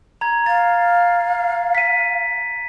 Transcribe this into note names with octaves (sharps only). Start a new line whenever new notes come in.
A#5 G#6
F5 A6
B6 D#7